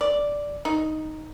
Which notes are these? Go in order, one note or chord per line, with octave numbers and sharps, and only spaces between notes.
D5
D#4